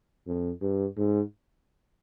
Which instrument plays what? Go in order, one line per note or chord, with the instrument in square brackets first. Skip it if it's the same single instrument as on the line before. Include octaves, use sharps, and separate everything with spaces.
[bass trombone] F2
G2
G#2